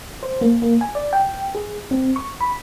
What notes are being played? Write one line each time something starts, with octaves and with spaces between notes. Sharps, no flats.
C5
A#3
A#3
G#5
D5
G5
G#4
C4
C#6
B5